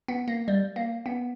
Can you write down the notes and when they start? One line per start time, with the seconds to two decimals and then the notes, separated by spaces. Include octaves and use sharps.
0.08 B3
0.28 A#3
0.48 G3
0.76 A#3
1.06 B3